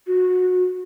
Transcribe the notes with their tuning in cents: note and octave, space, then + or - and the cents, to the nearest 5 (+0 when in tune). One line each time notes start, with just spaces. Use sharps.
F#4 -20